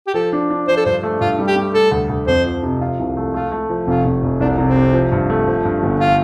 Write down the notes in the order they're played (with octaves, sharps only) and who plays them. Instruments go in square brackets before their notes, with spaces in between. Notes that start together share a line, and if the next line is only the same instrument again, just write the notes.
[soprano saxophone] G4
[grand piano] F3 [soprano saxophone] A4
[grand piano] D4
D4
[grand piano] F3 [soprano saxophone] C5
[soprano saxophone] A4
[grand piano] G2 [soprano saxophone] C5
[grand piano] A3
[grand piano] G2 [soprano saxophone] F4
[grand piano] G3
[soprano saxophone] G4
[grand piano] G3
[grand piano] A3 [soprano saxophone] A4
[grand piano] D2
D2
[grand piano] F2 [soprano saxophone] C5
[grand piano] F3
C3
F4
C2
A3
[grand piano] A3 [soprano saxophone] F4
[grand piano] A3
F3
[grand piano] F1 [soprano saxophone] F4
[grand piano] F1
F1
[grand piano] C2 [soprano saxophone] D4
[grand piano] C3
[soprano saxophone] C4
[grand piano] C3
F3
G2
A3
F3
G2
G1
[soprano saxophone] F4